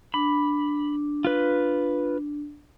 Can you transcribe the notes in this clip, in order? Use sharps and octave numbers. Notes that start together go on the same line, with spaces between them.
D4 B5
F4 B4